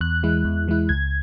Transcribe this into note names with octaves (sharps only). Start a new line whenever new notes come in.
E2 F#6
E3 G#3 E4
E2
E3 G#3 E4
C#2 G#6